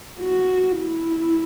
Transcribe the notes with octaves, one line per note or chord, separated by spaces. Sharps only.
F#4
E4